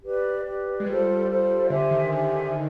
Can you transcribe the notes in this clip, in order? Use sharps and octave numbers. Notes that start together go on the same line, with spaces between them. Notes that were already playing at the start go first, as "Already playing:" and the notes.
G4 B4 D5
G4 B4 D5
G#3
G3 F4 A4 C5
F4 A4 C5
D3 G4 C5 E5 G#5
D#3
D3 G4 C5 E5 G#5
D#4